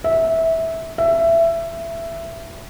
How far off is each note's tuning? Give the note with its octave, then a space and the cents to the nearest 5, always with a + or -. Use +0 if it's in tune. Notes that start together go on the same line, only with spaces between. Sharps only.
E5 -15
E5 +15